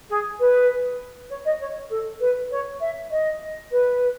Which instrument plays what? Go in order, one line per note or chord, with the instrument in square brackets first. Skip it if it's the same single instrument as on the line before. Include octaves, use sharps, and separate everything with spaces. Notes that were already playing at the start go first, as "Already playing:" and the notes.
[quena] G#4
B4
C#5
D#5
C#5
A4
B4
C#5
E5
D#5
B4